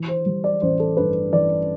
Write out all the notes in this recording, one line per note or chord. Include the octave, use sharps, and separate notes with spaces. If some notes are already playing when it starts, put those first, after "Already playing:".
Already playing: E3
C5
G3
D5
A1 C5
A4
G2 B4
E3 D5